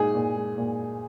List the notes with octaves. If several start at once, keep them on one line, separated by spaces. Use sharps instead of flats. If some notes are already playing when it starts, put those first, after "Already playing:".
Already playing: A#2 G#3 D#4 G#4 G#5
A#2
G#3
A#2